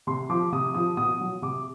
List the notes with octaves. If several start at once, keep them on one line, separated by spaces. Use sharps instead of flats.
C3 C6
F3 D6
C3 D#6
F3 D#6
B2 D#6
F#3
C3 D6